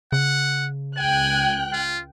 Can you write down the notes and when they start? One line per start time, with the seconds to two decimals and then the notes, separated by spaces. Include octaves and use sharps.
0.12 C#3 F#5
0.97 C#2 G5 G#5 F#6
1.73 F4